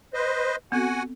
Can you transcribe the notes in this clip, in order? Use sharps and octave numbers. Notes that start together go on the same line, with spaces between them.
B4 C5 D#5
B3 C4 F#4 A4 F#5 G#5